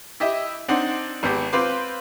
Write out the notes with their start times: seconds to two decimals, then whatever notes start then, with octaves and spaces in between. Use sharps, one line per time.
0.20 E4 G4 D#5 E5
0.68 C4 D4 D#4 F#5 C6
1.23 G#1 B3 G4
1.53 C4 F4 B4 C5 C6 D6